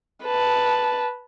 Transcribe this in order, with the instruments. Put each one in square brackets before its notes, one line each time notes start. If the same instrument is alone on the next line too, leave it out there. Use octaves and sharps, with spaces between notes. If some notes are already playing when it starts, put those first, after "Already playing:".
[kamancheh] B4 A5